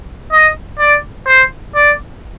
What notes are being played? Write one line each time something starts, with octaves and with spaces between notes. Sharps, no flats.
D#5
D5
C5
D5